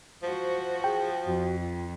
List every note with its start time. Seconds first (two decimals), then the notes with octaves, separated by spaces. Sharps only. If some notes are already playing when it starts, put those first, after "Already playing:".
0.23 F3 F#4 C5
0.84 G#4 G5
1.25 F2 F#4
1.60 F4